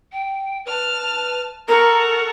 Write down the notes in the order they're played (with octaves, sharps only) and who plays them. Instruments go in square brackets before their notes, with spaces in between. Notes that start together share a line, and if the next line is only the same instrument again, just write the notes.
[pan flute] G5
[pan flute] B4 [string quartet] A5 F6
[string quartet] A4 F#5 C#6 [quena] A#4 [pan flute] A#5